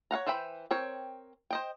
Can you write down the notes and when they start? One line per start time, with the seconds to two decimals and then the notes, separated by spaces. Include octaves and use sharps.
0.11 C#5 F5 F#5 A#5
0.27 E3 C5 E5 G5 B5
0.71 C4 A#4 C#5 G5
1.51 C5 D#5 G5